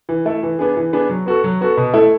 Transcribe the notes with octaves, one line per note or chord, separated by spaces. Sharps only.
E3
A3 E4 A4
E3
B3 D4 G#4
E3
B3 D4 G#4
F#3
B3 F#4 A4
F#3
B3 F#4 A4
B2
A3 E4 A4